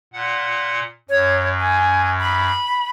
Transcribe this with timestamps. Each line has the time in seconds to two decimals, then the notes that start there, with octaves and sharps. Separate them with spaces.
0.13 A#2 F#5
1.09 F#2 C#5
1.60 G#5
2.20 B5